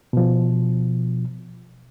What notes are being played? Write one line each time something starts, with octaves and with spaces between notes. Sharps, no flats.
B2 F3